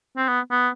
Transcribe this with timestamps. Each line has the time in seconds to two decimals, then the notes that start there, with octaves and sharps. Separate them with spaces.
0.17 C4
0.28 B3
0.51 B3